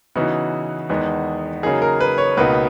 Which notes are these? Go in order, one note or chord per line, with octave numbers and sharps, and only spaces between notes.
C#3 E3 B3 D#4 F#4
E2 D#3 G#3 B3 D#4
C#3 F#3 A#3 D#4 G#4
A#4
B4
C#5
C#2 B2 A#3 D#4 B4